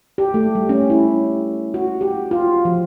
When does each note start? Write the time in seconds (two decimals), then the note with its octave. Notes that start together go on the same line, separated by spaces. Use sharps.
0.18 G4
0.34 A3
0.55 G3
0.69 C#4
0.90 E4
1.74 F#4
2.01 G4
2.31 F4
2.65 F3